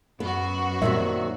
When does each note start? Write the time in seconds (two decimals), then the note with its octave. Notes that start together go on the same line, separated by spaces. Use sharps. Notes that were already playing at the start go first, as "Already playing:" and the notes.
0.20 F#2 B3 F#4
0.82 A#2 D#3 F#3 G3 C4 E5